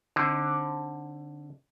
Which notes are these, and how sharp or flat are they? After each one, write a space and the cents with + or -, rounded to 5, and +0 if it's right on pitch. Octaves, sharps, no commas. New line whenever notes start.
D3 +0 C4 +30 D#4 +0